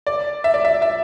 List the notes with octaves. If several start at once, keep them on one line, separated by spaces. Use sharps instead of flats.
D5
E5
D5
E5
E5